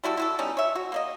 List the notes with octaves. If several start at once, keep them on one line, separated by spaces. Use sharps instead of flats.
G3 E4 F#4 A4
E4 F#4 A4
G3 B3 C#4 D#4
C#5 E5
F#4
A#3 D5 D#5